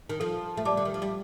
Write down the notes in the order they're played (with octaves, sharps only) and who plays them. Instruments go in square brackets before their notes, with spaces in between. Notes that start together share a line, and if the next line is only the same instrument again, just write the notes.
[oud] D#3
[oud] F3 [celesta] A4
[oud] A3
[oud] G3 [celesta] D5 A5 D6
[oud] D3
D#3
F3
G3